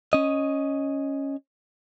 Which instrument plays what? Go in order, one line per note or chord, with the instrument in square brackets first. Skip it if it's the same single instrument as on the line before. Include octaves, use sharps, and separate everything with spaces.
[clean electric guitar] C#4 D#5